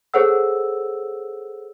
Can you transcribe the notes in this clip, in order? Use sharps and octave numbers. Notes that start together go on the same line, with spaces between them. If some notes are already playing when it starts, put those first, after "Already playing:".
G#4 A4 C5 C#5 F#5 E6